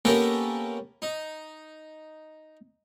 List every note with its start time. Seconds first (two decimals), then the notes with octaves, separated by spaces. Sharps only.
0.05 A#3 B3 C#4 G4 A4 A#4
1.02 D#4